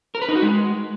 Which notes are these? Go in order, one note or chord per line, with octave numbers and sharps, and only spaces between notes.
A#4
B4
D#4
F#4
G#3